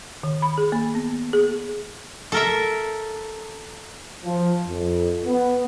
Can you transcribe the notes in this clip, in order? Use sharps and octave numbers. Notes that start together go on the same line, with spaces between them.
D#3
B5
G#4
A#3
B3
G#4
A4 A#4 E5
F3
F2
B3